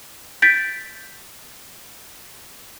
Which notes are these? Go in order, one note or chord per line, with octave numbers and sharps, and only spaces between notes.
G6 A6 B6 D7